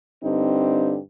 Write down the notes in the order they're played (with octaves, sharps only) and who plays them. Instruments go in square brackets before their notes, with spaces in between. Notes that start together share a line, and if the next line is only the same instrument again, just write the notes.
[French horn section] G2 D3 C4 D#4